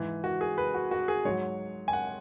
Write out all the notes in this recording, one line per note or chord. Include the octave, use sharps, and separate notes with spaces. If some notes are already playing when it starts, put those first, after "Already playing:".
Already playing: G#2 E3
F#4
G#4
B4
F#4
F#4
G#4
G#2 F#3 C#5
G#5
F#5